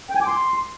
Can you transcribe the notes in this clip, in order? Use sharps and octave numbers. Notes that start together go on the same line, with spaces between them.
G5
G#5
D6
C6